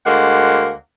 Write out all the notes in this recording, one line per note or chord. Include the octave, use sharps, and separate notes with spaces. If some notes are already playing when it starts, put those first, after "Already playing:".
D2 G#3 A#3 F#5